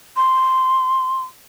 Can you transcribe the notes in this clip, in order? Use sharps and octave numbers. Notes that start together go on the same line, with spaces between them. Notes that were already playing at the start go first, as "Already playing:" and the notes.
C6